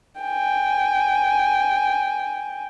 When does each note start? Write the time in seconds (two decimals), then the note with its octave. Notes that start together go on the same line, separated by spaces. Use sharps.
0.21 G5 G#5